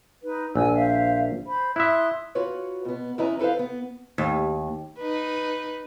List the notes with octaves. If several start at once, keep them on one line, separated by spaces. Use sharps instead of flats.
D#4 B4
A#1 G#5 E6
C5 E5 F5
C5 B5
E4 E5 C6 D#6 F#6
F4 F#4 B4 C#5
B2 B3
F2 C#4 E4 B4 D#5 A#5
E4 A4 B4 C5 F5
B3
D#2
D#4 B4